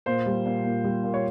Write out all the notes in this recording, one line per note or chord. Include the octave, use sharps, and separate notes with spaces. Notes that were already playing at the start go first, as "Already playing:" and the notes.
A#2 C5
G3
A#2
A#2
G3
A#2
C#5